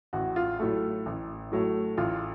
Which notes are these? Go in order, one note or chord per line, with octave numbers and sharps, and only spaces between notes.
A1 F#4
F4
A2 F#3 A3
A1
A2 F#3 A3
A1 F4